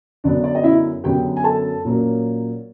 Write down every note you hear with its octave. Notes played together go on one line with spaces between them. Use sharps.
F#2 D3 F#3 B3 D4 D5
D5
D#5
E4 E5
F#2 D3 F#3 B3 G4 G5
G#5
A4 A5
A#2 F#3 A#3 C#4